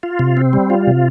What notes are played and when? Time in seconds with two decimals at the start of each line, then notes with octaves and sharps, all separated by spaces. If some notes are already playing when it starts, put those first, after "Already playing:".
0.03 F4
0.19 C3
0.37 C4
0.53 G3
0.70 F4
0.87 C3